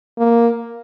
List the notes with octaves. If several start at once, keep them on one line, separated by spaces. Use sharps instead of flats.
A#3